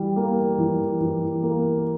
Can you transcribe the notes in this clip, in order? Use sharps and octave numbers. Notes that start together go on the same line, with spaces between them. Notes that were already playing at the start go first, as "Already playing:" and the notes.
Already playing: E3 G3
A#3
E3
E3
A#3